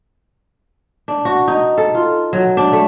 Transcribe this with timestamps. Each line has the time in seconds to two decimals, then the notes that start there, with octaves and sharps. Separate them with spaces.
1.08 D4
1.25 F#4
1.48 D#4
1.78 A4
1.95 F4
2.33 F#3
2.57 D4
2.73 A3